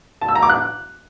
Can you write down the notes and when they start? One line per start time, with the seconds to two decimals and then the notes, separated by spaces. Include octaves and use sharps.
0.21 A5
0.28 E6
0.35 A#5
0.42 D6
0.50 F#6